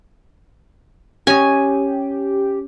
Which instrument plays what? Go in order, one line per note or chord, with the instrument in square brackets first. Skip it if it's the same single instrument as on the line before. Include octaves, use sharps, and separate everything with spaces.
[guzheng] C#4 D#5 [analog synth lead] G4 [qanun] G#5